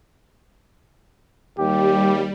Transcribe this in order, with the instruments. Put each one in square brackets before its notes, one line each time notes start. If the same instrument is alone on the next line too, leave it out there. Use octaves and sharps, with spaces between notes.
[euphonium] D#2 [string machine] G3 [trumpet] G4